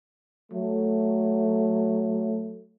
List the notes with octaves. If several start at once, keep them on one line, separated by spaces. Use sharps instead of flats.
F#3 A3